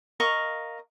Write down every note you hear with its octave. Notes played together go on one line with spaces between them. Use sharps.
A#4 D#5 F5 C#6